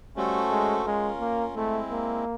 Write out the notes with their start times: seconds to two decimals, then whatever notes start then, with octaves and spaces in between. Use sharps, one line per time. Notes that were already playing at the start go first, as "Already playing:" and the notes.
0.16 G3 A3 C#4 F#4 A4 C5
0.51 G#3
0.85 G#3 C#4 F4 A#4
1.20 A#3
1.55 G#3 A3 C4 E4
1.90 A#3